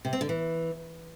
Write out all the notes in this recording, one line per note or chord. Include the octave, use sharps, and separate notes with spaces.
C3
C4
D3
E3